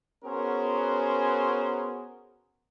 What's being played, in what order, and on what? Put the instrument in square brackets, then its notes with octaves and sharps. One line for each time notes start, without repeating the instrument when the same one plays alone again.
[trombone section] B3 C#4 F#4 G#4 A#4 C5